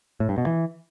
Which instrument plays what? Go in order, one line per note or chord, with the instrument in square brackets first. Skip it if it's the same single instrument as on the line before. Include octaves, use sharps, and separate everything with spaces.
[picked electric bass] A2
G2
B2
E3